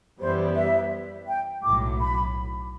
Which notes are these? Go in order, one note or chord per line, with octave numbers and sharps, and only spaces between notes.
F#2 E3 G3 B3 E4 C5
E5
G5
B1 A2 F#3 D6
B5